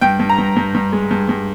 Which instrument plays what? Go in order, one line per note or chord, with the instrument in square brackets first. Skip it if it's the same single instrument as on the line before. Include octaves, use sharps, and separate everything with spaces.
[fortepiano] G2 G5
G2
A#5
G2
G2
G2
G#3
G2
G2